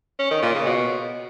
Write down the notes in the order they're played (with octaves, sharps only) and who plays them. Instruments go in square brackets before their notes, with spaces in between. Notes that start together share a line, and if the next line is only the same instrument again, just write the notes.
[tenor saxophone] C#4
D#3
A#2
C#3
B2